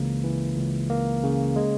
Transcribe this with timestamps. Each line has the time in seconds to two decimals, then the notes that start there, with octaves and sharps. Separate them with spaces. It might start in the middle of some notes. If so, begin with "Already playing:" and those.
Already playing: C#2 C#3 E3 A#3
0.24 E3
0.57 C#2
0.90 A#3
1.23 C#3
1.56 G#3